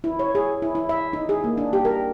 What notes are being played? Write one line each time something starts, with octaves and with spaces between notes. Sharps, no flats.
E4
C#5
G#4
E4
E4
E5
D#4
G#4
A#3
D4
G4
A#4